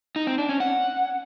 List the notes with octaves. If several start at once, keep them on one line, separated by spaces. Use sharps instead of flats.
D#4
C4
D4
C#4
F#5